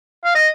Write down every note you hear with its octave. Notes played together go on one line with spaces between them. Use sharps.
F5
D#5